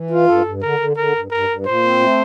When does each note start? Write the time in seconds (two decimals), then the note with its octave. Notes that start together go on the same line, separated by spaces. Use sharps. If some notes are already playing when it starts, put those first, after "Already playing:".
Already playing: E3
0.10 F4
0.27 G2 A4
0.45 G2
0.62 D3 A#4
0.79 D3
0.97 D3 A#4
1.15 G2
1.31 G2 A#4
1.49 G2
1.66 A#2 C5
1.83 C4
2.01 A3